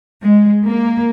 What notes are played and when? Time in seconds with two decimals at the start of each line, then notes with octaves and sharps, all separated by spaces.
0.23 G#3
0.66 A#3